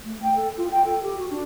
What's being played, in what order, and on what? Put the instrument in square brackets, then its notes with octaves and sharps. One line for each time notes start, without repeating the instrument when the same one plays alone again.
[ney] A3
G5
A4
F4
G5
A4
G4
F#4
D4